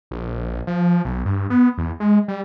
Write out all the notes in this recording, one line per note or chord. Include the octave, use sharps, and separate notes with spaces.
A#1
F3
B1
G2
B3
E2
G#3
G3